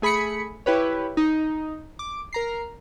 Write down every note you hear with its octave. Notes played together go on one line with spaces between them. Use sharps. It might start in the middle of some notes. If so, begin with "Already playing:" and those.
A3 G#4 B5 B6 C#7
E4 G4 B4 C#5
D#4
D6
A#4 A#5 C7